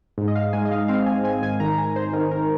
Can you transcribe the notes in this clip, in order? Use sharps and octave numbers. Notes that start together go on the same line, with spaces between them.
G#2
D#5
G#2 F5
G#3 G#5
D#5
G#2 F5
C4 F5
C4 G#5
C4 G#5
G#1 G#5
D#3 A#5
G#1 G#5
G#1 C5
D#3 A#4
G#1 A#4